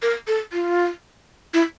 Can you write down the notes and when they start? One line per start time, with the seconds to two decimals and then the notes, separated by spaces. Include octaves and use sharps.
0.02 A#4
0.27 A4
0.53 F4
1.54 E4